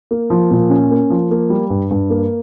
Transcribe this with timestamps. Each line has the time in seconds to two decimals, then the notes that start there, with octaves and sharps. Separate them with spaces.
0.11 A#3
0.30 F3
0.51 A#2
0.70 C#4
0.91 A#3
1.10 F3
1.31 A#3
1.50 G3
1.70 G2
1.91 G2
2.10 A#3